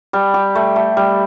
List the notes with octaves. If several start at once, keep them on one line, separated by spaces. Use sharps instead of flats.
G3
G4
A3
A3
G3